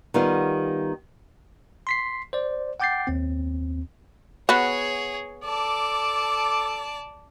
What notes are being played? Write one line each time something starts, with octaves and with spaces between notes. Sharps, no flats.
D#3 G3 B3 F4
C6 B6 C7
C5 D5
F#5 G5 D6 G6 A6 C7
D#2 C4
B3 F#4 G#4 C#5
A4 D5 A5 D6